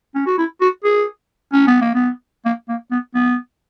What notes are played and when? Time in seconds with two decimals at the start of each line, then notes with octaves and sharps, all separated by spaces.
0.15 C#4
0.26 F#4
0.38 E4
0.61 F#4
0.84 G#4
1.53 C#4
1.67 B3
1.81 A#3
1.94 B3
2.45 A#3
2.69 A#3
2.91 B3
3.15 B3